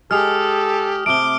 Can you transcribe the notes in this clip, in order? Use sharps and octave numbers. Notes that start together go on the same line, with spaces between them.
G#3 G4 A4 D#6 F6
C3 A3 D6 D7 G7